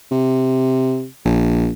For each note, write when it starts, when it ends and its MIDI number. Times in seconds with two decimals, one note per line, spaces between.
0.11 1.05 48
1.25 1.71 34